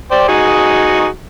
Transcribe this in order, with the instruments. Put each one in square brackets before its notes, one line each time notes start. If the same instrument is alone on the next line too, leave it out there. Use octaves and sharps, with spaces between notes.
[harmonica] C5 D5 G5
D#4 F#4 G#4